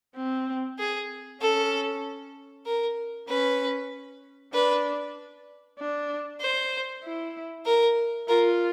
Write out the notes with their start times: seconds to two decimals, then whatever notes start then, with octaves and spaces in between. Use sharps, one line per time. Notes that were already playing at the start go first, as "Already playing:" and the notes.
0.16 C4
0.79 G#4
1.41 C#4 A4
2.66 A#4
3.28 C#4 B4
4.53 D4 B4
5.79 D4
6.41 C5
7.04 E4
7.66 A#4
8.28 F4 A#4